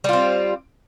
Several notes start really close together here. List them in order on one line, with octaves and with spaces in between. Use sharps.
G3 F4 C4